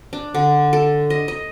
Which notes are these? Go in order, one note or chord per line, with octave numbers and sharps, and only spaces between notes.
D4
D3
A4
D#5
D#5